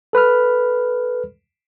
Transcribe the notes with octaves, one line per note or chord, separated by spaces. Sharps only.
A4 B4 B5 F6